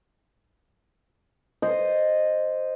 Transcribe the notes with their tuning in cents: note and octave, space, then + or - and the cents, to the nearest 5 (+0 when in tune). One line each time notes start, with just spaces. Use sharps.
C5 +0 D#5 -10